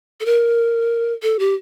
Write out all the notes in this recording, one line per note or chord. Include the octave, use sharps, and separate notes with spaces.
A4
A#4
A4
G4